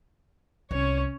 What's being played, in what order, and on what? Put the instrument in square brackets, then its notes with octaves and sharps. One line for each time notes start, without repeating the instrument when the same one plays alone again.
[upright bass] C2 [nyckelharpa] C#4 C#5